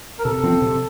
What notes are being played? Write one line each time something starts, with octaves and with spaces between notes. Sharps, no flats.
A#4
C3 A4
F3 C4
C3